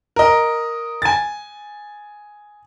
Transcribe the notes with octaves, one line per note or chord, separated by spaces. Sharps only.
A#4 D#5
G#5 A6